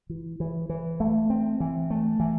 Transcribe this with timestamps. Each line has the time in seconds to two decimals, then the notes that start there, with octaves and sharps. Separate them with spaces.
0.09 E3
0.40 E3
0.69 E3
1.00 A3
1.30 C4
1.60 E3
1.90 A3
2.20 E3